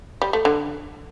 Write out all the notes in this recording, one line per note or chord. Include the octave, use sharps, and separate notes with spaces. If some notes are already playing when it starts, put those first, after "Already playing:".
G3
A3
D3